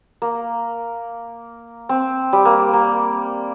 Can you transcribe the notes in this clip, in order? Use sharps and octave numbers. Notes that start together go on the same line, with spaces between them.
A#3
C4
G3
A#3
A#3